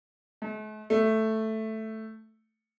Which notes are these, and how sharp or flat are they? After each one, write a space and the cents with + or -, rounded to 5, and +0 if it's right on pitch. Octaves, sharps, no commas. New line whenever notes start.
A3 -45
A3 +0